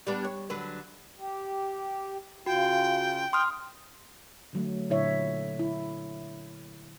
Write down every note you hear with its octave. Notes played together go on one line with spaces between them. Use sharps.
G3 B3 D4
C#5
D3 F#3 B4
G4
C#3 F4 F#4 G5
C6 D#6 F6
D3 F#3 A3
A#2 D3 F#3 E4 C#5 E5
E4